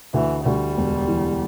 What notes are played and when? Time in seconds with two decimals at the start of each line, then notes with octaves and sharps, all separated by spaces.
0.14 D2 E3
0.45 D2 G3
0.77 E1
1.08 E3